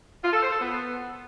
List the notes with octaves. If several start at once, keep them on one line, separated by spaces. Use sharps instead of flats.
F4
A4
C5
A4
B3